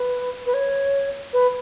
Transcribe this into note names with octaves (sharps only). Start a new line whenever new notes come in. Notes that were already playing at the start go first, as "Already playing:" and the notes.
Already playing: B4
B4
C#5
B4